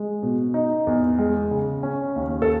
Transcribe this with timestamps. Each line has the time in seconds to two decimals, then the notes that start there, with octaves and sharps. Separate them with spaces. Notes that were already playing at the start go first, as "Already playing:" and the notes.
Already playing: G#3
0.23 B2
0.54 D#4
0.87 E2
1.18 G#3
1.51 C#3
1.83 C#4
2.16 D#2
2.42 A4